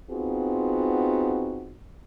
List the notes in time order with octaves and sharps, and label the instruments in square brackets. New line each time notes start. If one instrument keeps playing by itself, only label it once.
[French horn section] B3 C4 D#4 F4 F#4 G#4